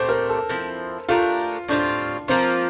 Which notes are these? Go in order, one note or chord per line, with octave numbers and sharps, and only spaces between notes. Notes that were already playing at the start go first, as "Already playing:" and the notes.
Already playing: A#2 A3 C4 G4 C5
A#4
A4
F3 C4 E4
A3 D4 F4 G4 A#4
A2 G3 C4 D4 F4
F3 A#3 C4 F4